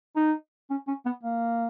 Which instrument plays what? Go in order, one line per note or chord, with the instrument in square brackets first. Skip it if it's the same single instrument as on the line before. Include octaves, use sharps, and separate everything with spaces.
[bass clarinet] D#4
C#4
C#4
B3
A#3